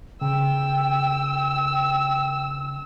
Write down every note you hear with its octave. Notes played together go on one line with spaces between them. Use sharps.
C#3 G5 E6